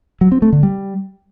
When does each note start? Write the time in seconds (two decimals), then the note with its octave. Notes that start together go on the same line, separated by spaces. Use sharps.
0.21 F#3
0.32 C4
0.42 A3
0.53 D3
0.63 G3